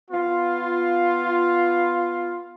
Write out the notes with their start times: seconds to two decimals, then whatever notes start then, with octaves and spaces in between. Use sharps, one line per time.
0.11 B3 F4